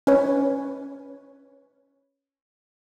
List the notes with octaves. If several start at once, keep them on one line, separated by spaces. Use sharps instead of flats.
C#4 B4 C#5